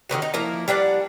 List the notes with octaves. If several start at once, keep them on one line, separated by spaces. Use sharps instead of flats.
D3 D#3 B3 F#4
D#4
F3 A#3 E4 A#4
G3 D4 D5 F#5